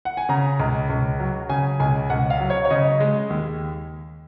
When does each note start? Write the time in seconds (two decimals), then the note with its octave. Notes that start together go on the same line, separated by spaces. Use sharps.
0.05 F#5
0.17 G#5
0.29 C#3 A#5
0.60 C#2
0.90 C#2
1.20 F#3
1.49 C#3 G#5
1.80 C#2 G#5
2.10 C#2 F#5
2.30 F5
2.40 F#3
2.50 C#5
2.65 C#5
2.70 C#3 D#5
3.00 G#3
3.30 D#2